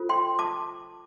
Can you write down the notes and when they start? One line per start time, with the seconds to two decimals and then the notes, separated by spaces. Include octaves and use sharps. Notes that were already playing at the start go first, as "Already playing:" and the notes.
Already playing: F4 A4 C5
0.09 G5 C6
0.39 A5 D6